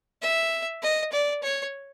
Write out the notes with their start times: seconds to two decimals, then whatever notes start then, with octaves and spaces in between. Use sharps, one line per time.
0.22 E5
0.82 D#5
1.12 D5
1.43 C#5